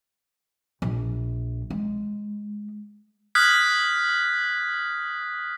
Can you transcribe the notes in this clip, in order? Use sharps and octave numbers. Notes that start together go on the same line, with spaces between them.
A#1
G#3
D#6 F6 F#6 G#6 B6